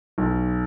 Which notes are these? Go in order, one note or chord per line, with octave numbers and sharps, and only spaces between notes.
B1